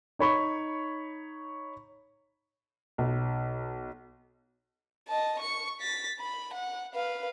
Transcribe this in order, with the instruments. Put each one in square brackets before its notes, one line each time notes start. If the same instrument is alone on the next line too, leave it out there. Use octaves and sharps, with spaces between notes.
[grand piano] D#4 C#5 B5 C#6
[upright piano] B1
[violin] D#5 A5
C#6 C#7
A6 B6
B5
F#5
B4 F5